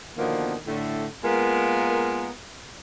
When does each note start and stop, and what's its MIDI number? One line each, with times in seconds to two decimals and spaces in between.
0.17 0.55 47
0.17 0.55 50
0.17 0.55 51
0.17 0.55 53
0.17 0.55 58
0.17 0.55 59
0.67 1.05 45
0.67 1.05 50
0.67 1.05 57
1.24 2.28 56
1.24 2.28 58
1.24 2.28 59
1.24 2.28 65
1.24 2.28 70